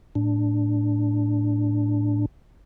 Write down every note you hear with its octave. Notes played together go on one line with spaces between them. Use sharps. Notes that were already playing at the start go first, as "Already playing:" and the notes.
A2 D4